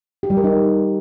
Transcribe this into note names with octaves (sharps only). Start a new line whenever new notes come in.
G4
G3
A#4
D#4